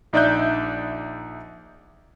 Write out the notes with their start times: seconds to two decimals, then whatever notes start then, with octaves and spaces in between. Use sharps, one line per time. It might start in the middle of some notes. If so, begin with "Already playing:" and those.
0.13 A#1 D#4 D5 E5 F#6 G6